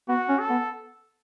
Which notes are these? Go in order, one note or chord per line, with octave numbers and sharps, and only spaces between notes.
B3 F#4
C#4
A4
B3